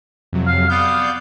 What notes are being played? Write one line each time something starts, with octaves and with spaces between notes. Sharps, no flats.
F2 C3 F#3
F5
B3 D5 F5 G6